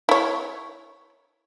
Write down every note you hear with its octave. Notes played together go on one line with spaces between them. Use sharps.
E4 C#5